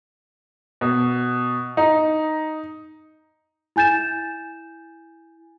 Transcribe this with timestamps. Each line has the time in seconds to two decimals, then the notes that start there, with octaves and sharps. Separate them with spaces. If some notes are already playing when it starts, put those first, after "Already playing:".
0.81 B2
1.77 D#4
3.76 E4 G#5 G6 A6 E7